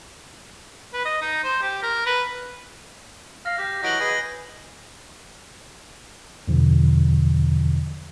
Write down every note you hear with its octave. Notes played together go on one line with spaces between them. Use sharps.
B4
D#5
D#4
C5
G4
A#4
B4
F5 A#6
G4 G6
E3 F#3 D#5 F#5 A#6 D7 F#7
G#4 B4 D#5 A#6
E2 B2 D3 F3